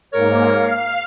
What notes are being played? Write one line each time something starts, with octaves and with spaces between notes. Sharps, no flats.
G#2 A#3 A#4 C#5
F5